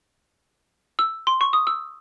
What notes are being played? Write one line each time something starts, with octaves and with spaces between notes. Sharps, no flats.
E6
C6
C#6
D#6
E6